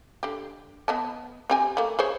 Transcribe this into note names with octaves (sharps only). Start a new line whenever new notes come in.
D3 G4
B3 D#5 A5
C4 G4 G#5
A3 A#3
G#4 C5 C#5